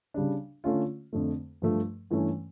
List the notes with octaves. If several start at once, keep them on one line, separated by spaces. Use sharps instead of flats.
C#3 G3 D4
D3 A3 C#4 F4
F2 D3 A3
G2 F3 A3
G2 E3 A3 C#4